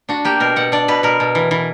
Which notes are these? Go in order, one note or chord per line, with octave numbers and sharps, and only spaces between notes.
D4 F#4
A#3 G4
B2 A#4
B2 F#5
D4 D5
B2 B4
B2 A#4
B2
E3
E3